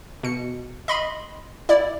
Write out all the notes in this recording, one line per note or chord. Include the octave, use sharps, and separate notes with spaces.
B2 C#7
D#5 B5 C6
E4 D5